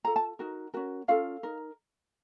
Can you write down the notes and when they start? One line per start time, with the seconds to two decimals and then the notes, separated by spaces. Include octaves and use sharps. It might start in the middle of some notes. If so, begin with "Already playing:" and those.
0.04 F4 A4 A#5
0.16 A5
0.39 D#4 F#4 A#4
0.74 C#4 F#4 A#4
1.08 C#4 F4 A4 F5
1.43 D#4 A#4